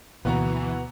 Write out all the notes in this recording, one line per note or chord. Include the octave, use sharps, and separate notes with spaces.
D2 B2 E3 A#3 B3 F#4 A#5